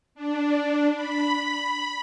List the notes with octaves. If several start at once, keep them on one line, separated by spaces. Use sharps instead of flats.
D4
B5